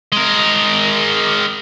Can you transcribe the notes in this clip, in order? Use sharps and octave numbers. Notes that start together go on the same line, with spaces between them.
G#3 A#4